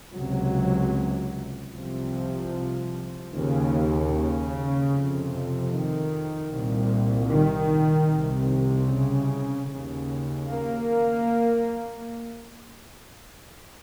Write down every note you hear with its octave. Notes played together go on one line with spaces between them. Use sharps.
C#2 C3 F#3
C2 C3 F3
D#2 C#3
C#3
F2 C3
D#3
C2 A#2
D#3
C2 C3
C#3
D#2 C#3
A#3